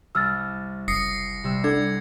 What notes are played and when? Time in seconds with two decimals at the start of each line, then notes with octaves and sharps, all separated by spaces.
0.15 C2 E6 F6 A6
0.88 F#1 D#6 A#6 C7 C#7
1.44 C3 G3 E6
1.64 D4 A4 F#5 G#6